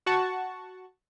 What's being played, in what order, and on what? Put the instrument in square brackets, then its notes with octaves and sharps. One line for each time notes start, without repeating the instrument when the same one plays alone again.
[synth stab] F#4 F#5 A5 C#6